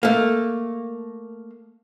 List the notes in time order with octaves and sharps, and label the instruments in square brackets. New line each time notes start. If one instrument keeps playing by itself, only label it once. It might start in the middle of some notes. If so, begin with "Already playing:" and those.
[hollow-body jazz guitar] A3 A#3